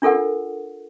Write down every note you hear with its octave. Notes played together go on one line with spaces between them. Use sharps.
D4 F4 A4 A#4 F#5